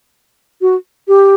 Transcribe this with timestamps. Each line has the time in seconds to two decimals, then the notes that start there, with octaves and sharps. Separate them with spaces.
0.61 F#4
1.08 G4